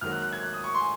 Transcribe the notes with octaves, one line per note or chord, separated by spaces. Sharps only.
G#1 G#2 F#3 A#3 F6
F#6
F#6
G#6
F#6
D#6
C#6
C6
G#5